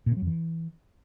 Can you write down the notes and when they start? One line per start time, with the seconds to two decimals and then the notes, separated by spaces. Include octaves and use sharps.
0.06 A#2
0.12 C3
0.17 F#3
0.22 F2
0.27 E3